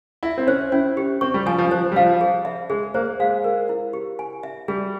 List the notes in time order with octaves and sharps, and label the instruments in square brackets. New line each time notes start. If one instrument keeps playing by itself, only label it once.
[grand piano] E4 [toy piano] E5
[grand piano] C4
[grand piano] C#4 [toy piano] C5
[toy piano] C#4 [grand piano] E4
[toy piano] G4
[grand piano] C4 [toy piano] C#6
[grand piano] G3
[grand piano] F3 [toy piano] G#5
[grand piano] F3
[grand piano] F3 [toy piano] C5
[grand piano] G3
[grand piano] F3 [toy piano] F5
[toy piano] G#4
E5
[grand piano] G#3 [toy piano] G#4
[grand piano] A#3 [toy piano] C5
[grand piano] G#3 [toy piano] F5
[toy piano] A#4
E4
G4
G#5
E5
[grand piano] G3 [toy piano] G#4